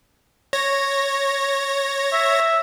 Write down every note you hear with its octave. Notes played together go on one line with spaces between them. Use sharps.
C#5 A#6
E5